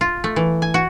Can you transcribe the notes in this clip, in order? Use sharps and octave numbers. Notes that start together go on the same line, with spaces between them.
F4
A3
E3
G#5
F#4